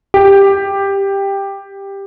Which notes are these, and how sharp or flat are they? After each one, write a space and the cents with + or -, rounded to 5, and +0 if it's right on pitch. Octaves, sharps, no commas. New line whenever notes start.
G4 +10